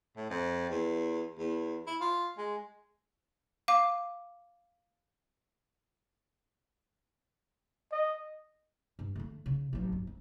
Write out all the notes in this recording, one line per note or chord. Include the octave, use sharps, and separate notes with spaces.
A2
F2
E2
E2
E4
F4
G#3
F5 D6
D#5
G2
D3 A3
C#3
A1 F#3
G2
C4